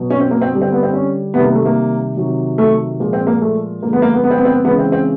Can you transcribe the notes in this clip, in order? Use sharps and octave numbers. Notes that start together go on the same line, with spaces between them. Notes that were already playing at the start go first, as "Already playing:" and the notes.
Already playing: B2 F#3
C#4
C4
A#3
C4
D3 G3
C4
B3
C4
C#4
C3 D#3 G3 B3
A#3
A3
A#3
C3 D#3 F#3
A3
A#2 F3 G#3
C4
A#3
A3
D3 F3 G#3 A#3
B3
A#3
B3
B3
C4
B3
C4
B3
C#3 E3 G#3 B3
C4
C4